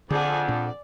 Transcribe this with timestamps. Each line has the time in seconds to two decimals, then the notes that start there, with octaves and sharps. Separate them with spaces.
0.11 F2 D3 G#4 D5 F#5 G#5
0.48 A#2 D4 D5